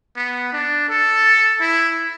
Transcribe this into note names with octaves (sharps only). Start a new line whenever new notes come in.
B3
D4
A4
E4